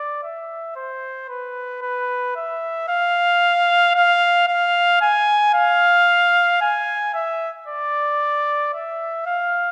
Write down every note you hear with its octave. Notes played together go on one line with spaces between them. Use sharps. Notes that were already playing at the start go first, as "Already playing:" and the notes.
Already playing: D5
E5
C5
B4
B4
E5
F5
F5
F5
G#5
F5
G#5
E5
D5
E5
F5